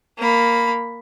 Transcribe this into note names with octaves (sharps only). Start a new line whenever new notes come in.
A#3 B5